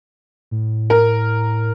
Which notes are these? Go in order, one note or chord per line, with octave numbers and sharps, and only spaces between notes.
A2
A#4